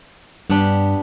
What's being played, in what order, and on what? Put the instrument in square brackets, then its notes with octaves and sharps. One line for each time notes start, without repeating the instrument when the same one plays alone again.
[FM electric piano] G2 [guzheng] B3 D4 G4